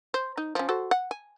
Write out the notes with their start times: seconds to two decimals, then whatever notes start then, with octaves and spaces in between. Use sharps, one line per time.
0.14 C5
0.37 D#4
0.55 F3 C#4
0.69 F#4 A4 C5
0.91 F#5
1.11 G#5